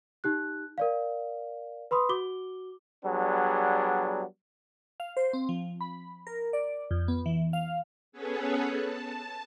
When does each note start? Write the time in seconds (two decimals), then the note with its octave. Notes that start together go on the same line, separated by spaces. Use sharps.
0.24 D#4 G4 F#6
0.78 A#4 D5 F5
1.91 B4 B5 C6 D#6
2.09 F#4 D6 G7
3.04 F#3 G3 B3 D4 G#4
5.00 F5
5.17 C5
5.33 C4
5.49 F3
5.81 B5
6.27 A#4
6.53 D5
6.91 F2
7.08 B3
7.26 E3
7.53 F5
8.12 B3 C#4 G#4 A4 B4 C#5
8.71 A5